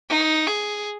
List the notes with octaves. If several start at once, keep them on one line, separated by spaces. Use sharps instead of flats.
D#4
G#4